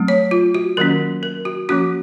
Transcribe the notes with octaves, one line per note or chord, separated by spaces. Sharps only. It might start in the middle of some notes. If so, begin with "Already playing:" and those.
Already playing: F#3 A3 C4
C#5
F4
F#4
D#3 F#3 A#3 C#4 A#4
A#4
F#4
F3 A#3 C#4 F#4